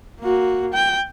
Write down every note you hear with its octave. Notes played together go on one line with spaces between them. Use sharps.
A#3 F#4
G5